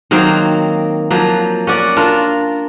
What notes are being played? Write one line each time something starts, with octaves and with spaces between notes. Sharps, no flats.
D#3 F#3 A#3 C4
F3 F#3 A#3
C#4 F#4 D5
D4 F4 A#4